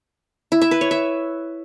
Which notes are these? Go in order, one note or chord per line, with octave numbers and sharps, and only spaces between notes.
E4
E5
B4
C#5
E5